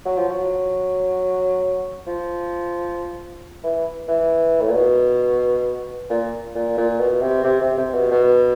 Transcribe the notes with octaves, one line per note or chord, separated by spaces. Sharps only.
F#3
F3
F#3
F3
E3
E3
A2
A#2
B2
A#2
A#2
A#2
B2
C3
C3
C3
C3
B2
B2